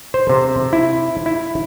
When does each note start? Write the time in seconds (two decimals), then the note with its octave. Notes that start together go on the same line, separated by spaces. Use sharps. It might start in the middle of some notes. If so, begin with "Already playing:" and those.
0.14 C5
0.29 C3
0.73 E4
1.26 E4